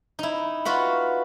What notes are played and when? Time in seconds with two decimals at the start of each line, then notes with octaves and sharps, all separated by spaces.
0.19 D#4 E4
0.65 F4 F#4 B4 F#5